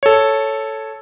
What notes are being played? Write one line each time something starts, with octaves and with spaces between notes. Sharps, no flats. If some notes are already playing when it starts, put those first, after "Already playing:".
A4 C#5